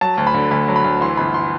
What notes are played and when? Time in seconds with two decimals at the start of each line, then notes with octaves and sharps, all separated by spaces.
0.01 F#3 A5
0.18 D2
0.27 B5
0.34 D3
0.51 D2 B5
0.68 F#3
0.76 B5
0.84 D2
1.01 E3 C6
1.17 G1 B5
1.34 C6